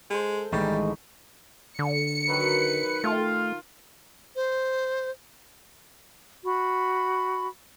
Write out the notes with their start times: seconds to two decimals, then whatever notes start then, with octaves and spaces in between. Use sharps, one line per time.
0.10 G#3 A4 C5
0.52 A1 D#3 E3 G3 G#3 D#4 C#6
1.79 D3 C#7
2.28 D#3 F#3 B4
3.04 A3 F4 G5 C6
4.35 C5
6.45 F#4 B5